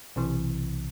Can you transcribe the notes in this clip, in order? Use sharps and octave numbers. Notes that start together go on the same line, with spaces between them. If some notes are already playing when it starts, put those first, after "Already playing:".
B1 C3 E3